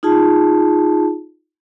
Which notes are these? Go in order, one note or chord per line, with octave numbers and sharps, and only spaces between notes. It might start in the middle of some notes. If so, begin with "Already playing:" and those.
D#4 F4 G#4 A5